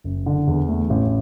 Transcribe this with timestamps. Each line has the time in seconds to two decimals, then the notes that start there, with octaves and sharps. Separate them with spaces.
0.04 F#1
0.26 D3
0.47 E2
0.69 A3
0.90 A1